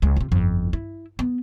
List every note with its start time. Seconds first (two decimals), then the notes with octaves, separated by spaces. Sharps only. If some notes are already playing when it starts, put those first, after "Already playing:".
0.02 C#2 G#3
0.17 C3 F4
0.32 G1 F2
0.73 E4
1.19 B3